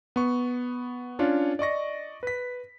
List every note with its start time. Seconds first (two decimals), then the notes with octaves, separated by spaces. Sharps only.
0.16 B3 C#6
1.19 C#4 D4 F4 C#5
1.59 D5 D#5 C#6 A#6
2.23 B4 B6